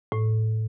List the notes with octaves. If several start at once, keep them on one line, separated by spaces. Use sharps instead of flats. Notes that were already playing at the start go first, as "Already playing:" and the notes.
A2